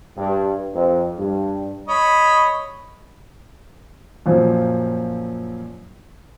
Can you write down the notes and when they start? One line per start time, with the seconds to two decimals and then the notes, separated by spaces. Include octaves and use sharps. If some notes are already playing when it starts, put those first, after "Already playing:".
0.17 G2
0.74 F2
1.19 G2
1.88 C#5 D#5 B5
4.26 F#2 A#2 F3